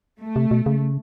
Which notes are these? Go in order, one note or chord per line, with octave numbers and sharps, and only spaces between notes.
A3
C3
B2
C#3